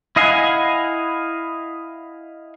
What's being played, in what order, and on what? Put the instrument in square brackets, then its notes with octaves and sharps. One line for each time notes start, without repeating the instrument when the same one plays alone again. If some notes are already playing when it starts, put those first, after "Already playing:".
[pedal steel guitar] E4 D#5 F5 F#5 G#5